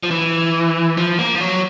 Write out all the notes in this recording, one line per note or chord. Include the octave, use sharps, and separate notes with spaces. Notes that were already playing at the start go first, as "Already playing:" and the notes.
F3
E3
F3
A#3
F3
F#3